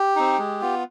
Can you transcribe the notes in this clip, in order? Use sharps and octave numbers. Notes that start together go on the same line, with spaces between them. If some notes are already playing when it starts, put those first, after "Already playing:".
Already playing: G4
C4 D#4
G#3
B3 F4